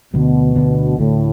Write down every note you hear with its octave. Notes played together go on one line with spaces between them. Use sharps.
D2 B2 D3 G3 B3
D2 D3 B3 D4
D2 A2 D3 A3